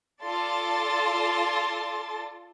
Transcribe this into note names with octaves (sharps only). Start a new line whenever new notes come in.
F4 A4 D5 A5 C6 A6